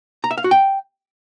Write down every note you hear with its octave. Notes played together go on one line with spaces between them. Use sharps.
A#5
E5
F5
F#4
G5